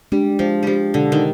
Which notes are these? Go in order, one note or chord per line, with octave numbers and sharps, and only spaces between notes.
G3 G#3 D4 G4
F3 G#3
F3 G3 D4 G4
B2 D3
D#3